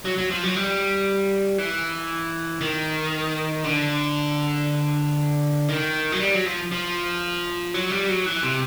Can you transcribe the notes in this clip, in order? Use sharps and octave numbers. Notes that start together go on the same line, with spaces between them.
F#3
F#3
F3
F#3
G3
E3
D#3
D3
D#3
F#3
G3
F#3
F3
F3
F#3
G3
F#3
E3
C3